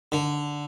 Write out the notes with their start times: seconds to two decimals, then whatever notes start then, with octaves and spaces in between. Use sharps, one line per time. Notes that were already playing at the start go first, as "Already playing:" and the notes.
0.12 D3